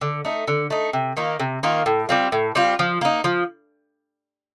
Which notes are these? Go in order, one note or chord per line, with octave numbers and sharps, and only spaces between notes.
D3
A3 D#4
D3
A3 D#4
C3
D#3 A#3 F4
C3
D#3 A#3 F4
A2
G3 C4 F4
A2
G3 C4 F4
F3
A#3 D#4
F3